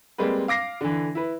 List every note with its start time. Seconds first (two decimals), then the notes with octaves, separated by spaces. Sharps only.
0.18 G3 G#3 A#3 C4 B4
0.48 F5 D6 A#6 C7
0.81 D3 E3
1.15 E4 B4